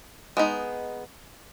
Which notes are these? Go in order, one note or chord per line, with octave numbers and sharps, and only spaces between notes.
G#3 B3 D#4